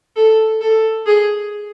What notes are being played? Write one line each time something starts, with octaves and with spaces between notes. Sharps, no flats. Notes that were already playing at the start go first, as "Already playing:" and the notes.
A4
A4
G#4